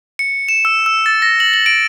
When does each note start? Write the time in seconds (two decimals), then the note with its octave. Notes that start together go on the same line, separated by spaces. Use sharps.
0.19 C#7
0.48 E7
0.65 E6
0.86 E6
1.06 A6
1.22 A#6
1.40 F#7
1.54 F#7
1.66 D7